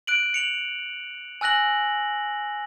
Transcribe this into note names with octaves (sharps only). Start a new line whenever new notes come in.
F#6 D7 F#7
C#7 F7 F#7
G#5 E6 F#6 A#6 F#7